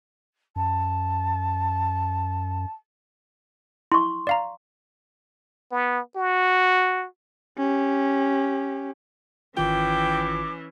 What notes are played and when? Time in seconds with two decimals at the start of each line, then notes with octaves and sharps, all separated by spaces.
0.56 F#2 A5
3.92 E4 C6 C#6
4.27 D5 F5 A#5
5.71 B3
6.16 F#4
7.58 C#4 G4
9.57 G#1 D#3 E3 C#4 F4 G5 D6